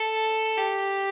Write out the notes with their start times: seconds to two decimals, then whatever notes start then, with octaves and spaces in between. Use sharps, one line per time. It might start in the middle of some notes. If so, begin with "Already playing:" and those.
Already playing: A4
0.57 G4